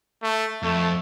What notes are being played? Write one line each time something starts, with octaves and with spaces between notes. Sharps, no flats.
A3
F2 A3